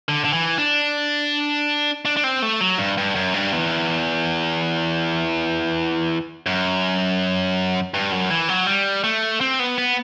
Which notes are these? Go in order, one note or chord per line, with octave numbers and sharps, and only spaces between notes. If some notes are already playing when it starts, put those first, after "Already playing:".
D3
D3
E3
D4
D4
D4
C4
A3
F#3
G2
G2
F#2
G2
E2
F#2
G2
F#2
E3
F#3
G3
A3
C4
B3
B3